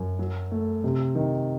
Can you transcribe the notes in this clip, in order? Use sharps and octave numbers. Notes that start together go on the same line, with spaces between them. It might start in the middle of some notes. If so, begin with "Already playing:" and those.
Already playing: F#2
F#3
A3
C3
D#3